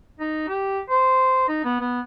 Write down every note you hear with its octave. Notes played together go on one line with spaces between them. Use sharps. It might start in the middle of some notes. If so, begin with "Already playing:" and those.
D#4
G4
C5
D#4
B3
B3